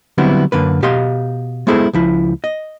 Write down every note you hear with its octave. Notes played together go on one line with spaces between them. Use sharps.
D3 F#3 G3 B3 C4 E4
F#2 D3 A#3 B4
B2 G4 D#5 F5 C6
G#3 B3 E4 G#4 A4 C5
C#2 F3 E4
D#5